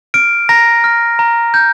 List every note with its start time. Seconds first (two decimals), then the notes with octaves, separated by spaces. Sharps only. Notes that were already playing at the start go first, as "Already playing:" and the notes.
0.14 F6 D7
0.49 A#5 A#6
0.84 F6
1.19 A#5
1.54 G6